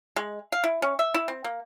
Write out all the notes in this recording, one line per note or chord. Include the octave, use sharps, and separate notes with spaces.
G#3
F5
E4
C#4
E5
E4
C4
A#3